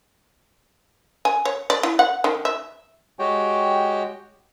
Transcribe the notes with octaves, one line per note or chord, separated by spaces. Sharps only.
G#5
C#5
D5
E4
F#5
D#3
E5
G#3 F#4 G4 C#5 G5